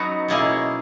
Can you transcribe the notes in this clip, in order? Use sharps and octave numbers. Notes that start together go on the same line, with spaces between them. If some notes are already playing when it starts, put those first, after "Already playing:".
Already playing: F#3 B3 C#4 D#4 F#4
B2 A#3 C#4 E4 G#4